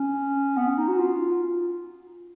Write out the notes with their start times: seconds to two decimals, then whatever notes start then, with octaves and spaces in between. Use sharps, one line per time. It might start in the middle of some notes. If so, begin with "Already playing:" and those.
Already playing: C#4
0.57 B3
0.67 C#4
0.77 D#4
0.88 F#4
0.98 F4